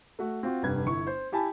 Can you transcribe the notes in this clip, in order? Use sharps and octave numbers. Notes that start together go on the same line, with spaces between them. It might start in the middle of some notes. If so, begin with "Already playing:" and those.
A3 F#4
C4 F4 F#4
F1 G2 B4 G#6
G1 E4 C#6
C5
E4 G4 G#5 A5 B5